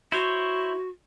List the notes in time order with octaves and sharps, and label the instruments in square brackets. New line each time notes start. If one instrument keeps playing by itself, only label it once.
[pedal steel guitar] E4 C5 C#5 [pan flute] F#4